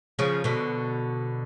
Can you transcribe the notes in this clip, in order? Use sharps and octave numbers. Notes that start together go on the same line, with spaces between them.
C#3 F3
B2 D3